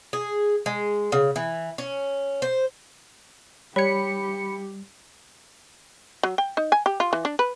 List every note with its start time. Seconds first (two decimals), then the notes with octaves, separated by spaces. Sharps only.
0.13 G#4
0.66 G#3
1.12 C#3
1.36 E3
1.78 C#4
2.42 C5
3.76 G3 G4 C#5 B5 G#6 C#7
6.23 F#3
6.38 G5
6.57 D#4
6.72 G#5
6.86 G4
7.00 F4
7.13 E3
7.25 D4
7.39 B4